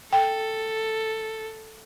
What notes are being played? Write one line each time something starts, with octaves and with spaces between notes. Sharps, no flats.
A4 G5